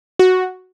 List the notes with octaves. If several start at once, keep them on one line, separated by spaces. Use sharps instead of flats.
F#4